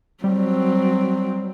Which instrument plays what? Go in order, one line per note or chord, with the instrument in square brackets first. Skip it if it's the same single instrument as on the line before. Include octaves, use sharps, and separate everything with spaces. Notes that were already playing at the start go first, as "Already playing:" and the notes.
[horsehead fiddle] F#3 C4 [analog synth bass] G3